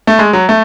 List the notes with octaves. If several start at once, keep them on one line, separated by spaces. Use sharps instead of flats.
A3
G#3
F#3
A3